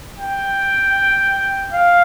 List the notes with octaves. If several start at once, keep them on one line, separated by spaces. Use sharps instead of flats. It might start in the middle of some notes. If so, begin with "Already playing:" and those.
G5
F5